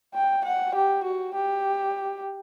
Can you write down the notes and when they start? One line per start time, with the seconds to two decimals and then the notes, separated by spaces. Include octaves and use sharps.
0.14 G5
0.45 F#5
0.75 G4
1.04 F#4
1.34 G4